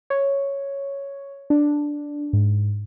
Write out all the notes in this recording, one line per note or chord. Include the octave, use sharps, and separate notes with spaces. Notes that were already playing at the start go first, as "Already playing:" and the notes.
C#5
D4
G#2